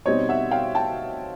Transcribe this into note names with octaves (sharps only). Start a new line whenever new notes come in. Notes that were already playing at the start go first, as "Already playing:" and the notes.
B2 G3 C4 D#4 C#5 D#5
E5 F#5
F5 G5
G5 A5